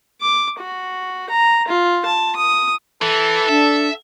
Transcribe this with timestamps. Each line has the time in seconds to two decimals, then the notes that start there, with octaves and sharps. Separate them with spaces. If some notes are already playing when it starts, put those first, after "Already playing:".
0.21 D6
0.60 F#4
1.30 A#5
1.68 F4
2.05 A5
2.36 D#6
3.02 E3 A4
3.49 D4 E5